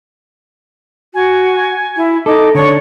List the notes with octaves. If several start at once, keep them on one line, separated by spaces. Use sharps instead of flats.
F#4 G#5
E4
D#4 A4 D6
D3 D4 C#5 C#6